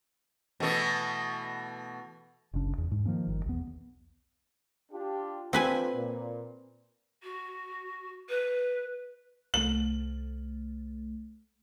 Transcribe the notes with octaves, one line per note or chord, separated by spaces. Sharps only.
B2 E3 A3
F#1 C2 C#3 D4
E2
G#2
D#3 F3 A#3 C#4
G1 D#3
B1 E2 B3
D4 F4 G4
C4 D4 F4 A4 B4 G#5
A#2
F#4
B4
C2 A3 F#7